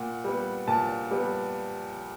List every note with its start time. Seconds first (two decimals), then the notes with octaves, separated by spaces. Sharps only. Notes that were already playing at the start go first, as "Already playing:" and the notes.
Already playing: A#2 F#5
0.24 G3 B3
0.67 A#2 A5
1.11 G3 B3